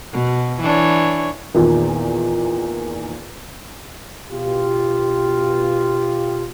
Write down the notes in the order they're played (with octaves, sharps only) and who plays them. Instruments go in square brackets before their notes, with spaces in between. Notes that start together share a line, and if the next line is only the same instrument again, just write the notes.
[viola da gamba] B2
E3 D4 C#5
[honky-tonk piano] E2 A#2 D#3
[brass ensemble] B2 F4 G4